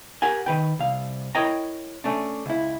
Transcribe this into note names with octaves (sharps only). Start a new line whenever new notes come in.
G4 A#4 F#5 G#5
D#3 B4 G5
C2 F5
E4 A#4 C#5 D#5 G5 A#5
A3 C#4 D4
C#2 E4